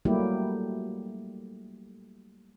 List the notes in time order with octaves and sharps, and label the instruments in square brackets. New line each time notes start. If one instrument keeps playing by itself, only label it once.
[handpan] F#3 G3 A3 A#3 E4 G4